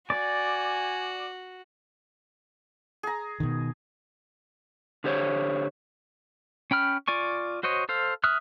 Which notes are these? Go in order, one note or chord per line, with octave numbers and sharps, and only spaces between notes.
F#4 D5 G#5
G#4 A#5
B2 D#3
D3 G4 C5 C#5
C#4 G5 B5 F6
F4 D5 G#5 C#6
F#4 C5 C#5 D#5
A4 C5 F5
E5 D#6 F6 F#6